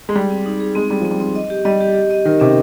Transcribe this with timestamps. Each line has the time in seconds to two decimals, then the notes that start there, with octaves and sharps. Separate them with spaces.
0.09 G#3
0.15 G3 G#4
0.31 C4
0.46 D#4
0.60 G#4
0.75 G#3 C4
0.90 G3 C4
1.01 F3 C4
1.11 G3
1.20 C4
1.35 D#5
1.50 G4
1.65 G3 D#5
1.81 G4
1.95 G4
2.11 D#5
2.25 D#3 A#4
2.40 C3 C#4